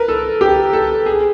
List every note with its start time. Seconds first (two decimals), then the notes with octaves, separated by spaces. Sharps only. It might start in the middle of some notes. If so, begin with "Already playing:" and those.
Already playing: A#4 B4
0.08 A4
0.41 G4
0.73 A4
1.06 G#4